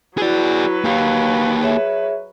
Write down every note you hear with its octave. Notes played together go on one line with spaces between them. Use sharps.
F#3 E4 F#4 G#4 B4 D5
A#3 G4 F5
G#4 C#5 E5